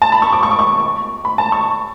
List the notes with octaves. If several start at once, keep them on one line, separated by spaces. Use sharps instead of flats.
A5
B5
C#6
D6
C#6
D6
C#6
B5
A5
C#6